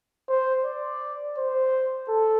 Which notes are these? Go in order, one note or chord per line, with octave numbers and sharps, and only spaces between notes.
C5
D5
C5
A4